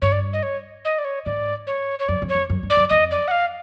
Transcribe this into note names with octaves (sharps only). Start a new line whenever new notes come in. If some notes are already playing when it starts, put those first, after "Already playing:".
G2 C#5
D5
D#5
C#5
D#5
D5
C#5
G#2 D5
C#5
C#5
F#2 D5
F2
C#5
F2
F#2
G2
D5
F#2
F2 D#5
D5
F#5
F5